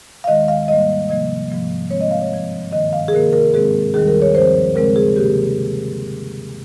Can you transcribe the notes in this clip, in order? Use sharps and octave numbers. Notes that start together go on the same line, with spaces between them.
F5
D#2 D#3 G#3 D#5
F5
G#2 G3 A#3 D#5
C3 F3 A#3 D#5
G#2 F3 A#3
C3 F3 G#3 C4 C#5
D#5
F5
C#5
G2 F3 C4
G2 D#3 A#3 D#5
F5
G#4
C3 D#3 A#3 A#4
A#4
G#2 D#3 G#3 C4 G#4
D#2 D#3 G3 G#4
A#4
C#5
G2 F3 C4 C5
D#2 C#3 G#3 C4 A#4
G#4
C3 D#3 A#3 G4